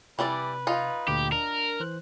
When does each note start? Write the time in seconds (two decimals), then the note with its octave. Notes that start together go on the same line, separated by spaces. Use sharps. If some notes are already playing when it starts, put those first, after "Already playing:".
0.19 C3 E3 G3 B4 D5
0.67 D#4 F4
1.08 D2 A#2 D3 G4
1.32 D4 A#4
1.80 E3 C5 F#6